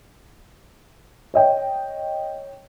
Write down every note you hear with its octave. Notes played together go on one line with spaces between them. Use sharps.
C#5 D#5 G5